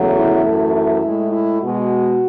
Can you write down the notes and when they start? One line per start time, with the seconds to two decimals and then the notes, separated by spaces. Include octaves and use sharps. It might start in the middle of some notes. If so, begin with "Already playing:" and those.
Already playing: E2 C#3 F#3 A3
0.16 E4
0.45 F#2 E3 A3
0.74 E4
1.03 A2 G#3
1.32 E4
1.61 B2 G#3 F#4